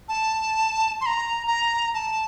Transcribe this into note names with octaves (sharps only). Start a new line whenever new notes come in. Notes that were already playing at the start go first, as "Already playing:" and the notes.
A5
C6
A#5
A#5
A5